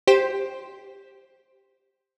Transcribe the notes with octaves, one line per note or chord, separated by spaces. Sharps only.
G4 C5